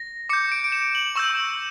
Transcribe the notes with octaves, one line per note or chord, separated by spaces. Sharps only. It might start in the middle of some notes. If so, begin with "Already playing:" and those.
Already playing: A#6
D6 G6 C#7
D7
D7
E7
F#7
C#6 E6 G6 E7